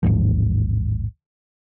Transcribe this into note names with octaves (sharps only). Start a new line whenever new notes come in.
A1 D#2 G#2 F3